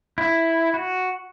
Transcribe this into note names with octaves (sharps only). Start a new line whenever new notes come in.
E4
F#4